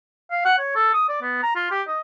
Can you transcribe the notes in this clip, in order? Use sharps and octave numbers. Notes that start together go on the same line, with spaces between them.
F5
F#5
C#5
A4
D#6
D5
B3
A#5
F4
G4
D#5